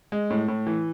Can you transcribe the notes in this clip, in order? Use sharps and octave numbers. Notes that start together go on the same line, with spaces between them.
G#3
A2
A2
E3